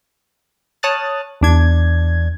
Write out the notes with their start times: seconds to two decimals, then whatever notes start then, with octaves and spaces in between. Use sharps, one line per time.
0.83 C#5 A5 D#6 F6 F#6 A6
1.41 E2 D4 G#6